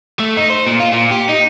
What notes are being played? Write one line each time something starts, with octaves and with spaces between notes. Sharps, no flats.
A3
D#4
C5
A#2
F4
A#2
G4
D#4